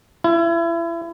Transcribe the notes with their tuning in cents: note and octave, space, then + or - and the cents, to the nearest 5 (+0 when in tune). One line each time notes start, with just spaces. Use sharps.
E4 +30